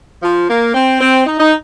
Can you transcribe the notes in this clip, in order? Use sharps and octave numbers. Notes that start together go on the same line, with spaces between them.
F3
A#3
C4
C4
D#4
D#4